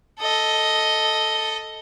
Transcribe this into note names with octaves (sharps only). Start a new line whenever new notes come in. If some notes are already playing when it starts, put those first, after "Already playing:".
A4 D#5